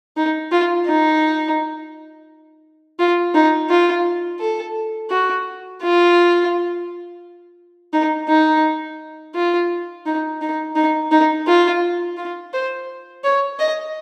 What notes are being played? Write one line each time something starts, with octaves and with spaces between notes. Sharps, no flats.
D#4
F4
D#4
F4
D#4
F4
A4
F#4
F4
D#4
D#4
F4
D#4
D#4
D#4
D#4
F4
F4
C5
C#5
D#5